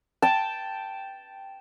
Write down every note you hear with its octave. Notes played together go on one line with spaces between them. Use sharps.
G5 A5